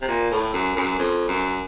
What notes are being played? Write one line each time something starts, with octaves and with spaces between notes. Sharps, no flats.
C3
A#2
A2
F#2
F#2
F2
F#2